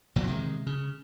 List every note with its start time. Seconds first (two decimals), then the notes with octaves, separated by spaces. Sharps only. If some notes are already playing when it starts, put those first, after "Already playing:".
0.16 E1 A#2 E3 F#3
0.27 C3 D#3 G#3
0.67 C#3